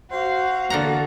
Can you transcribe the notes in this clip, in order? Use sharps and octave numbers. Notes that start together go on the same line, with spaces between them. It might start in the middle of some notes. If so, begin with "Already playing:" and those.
F#4 C5 F5
E2 D3 A#3 A4 F#5 A#5